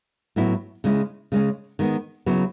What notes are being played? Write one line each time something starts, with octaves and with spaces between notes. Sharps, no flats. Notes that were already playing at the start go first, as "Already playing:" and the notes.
A2 F#3 B3 E4
C#3 G#3 C#4 E4
C#3 G#3 C#4
D#3 G#3 B3
C#3 F#3 B3 E4